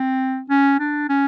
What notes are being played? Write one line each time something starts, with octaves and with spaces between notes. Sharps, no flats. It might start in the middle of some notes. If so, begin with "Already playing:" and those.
Already playing: C4
C#4
D4
C#4